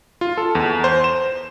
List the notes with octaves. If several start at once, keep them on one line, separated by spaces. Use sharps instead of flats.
F4
A4
E2
C5
E7